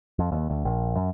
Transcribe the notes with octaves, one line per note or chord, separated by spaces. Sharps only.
F2
D#2
D2
A#1
F#2